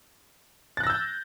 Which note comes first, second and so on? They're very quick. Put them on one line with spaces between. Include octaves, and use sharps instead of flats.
A6 F#6 A#6 E6 G6